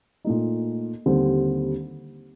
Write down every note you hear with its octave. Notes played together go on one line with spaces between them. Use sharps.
A#2 A3 D#4
D#2 D3 G3 C4